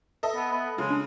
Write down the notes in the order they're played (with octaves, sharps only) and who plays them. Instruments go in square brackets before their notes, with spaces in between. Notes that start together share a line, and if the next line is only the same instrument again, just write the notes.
[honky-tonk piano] A4 D#5 E5
[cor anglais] B3
B3
[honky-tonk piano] C#3 [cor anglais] G#3
[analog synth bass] D4